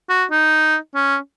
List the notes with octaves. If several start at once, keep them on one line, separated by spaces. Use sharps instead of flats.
F#4
D#4
C#4